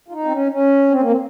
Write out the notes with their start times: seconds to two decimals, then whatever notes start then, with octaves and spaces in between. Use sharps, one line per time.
0.08 F4
0.12 D#4
0.25 C4
0.32 C#4
0.52 C#4
0.91 C4
1.02 A#3
1.10 C4